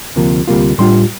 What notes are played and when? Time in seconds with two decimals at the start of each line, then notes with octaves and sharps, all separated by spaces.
0.16 D2 C3 F3 A#3
0.47 D2 C3 G3 A#3 F4
0.78 A2 G3 D4 F4 C6